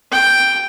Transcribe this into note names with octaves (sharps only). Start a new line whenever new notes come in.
G5